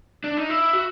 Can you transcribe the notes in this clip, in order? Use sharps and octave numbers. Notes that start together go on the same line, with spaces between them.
D4
D#4
E4
F#4